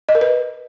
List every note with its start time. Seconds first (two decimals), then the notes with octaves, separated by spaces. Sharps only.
0.09 D#5
0.15 A#4
0.21 B4